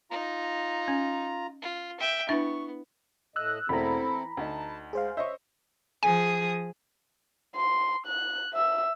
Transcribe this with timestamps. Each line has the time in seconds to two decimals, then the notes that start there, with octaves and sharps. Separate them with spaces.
0.11 D#4 F4 A#5
0.88 C#4
1.61 F4
2.00 E5 G5
2.29 B3 D4 E4 E5 C#6
3.36 A2 A3 D#5 E6 F#6
3.69 E1 A3 C4 E4 A4 A#5 B5
4.04 E3
4.37 D2 D#4 A5
4.93 G#3 G#4 C5 F5
5.17 C5 C#5 D#5 E5 C#6
6.03 F3 G#4 G#5 D#6
7.56 C6
8.07 F#6
8.53 E5 E6